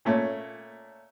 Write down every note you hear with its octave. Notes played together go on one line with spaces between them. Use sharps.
A#2 A3 C#4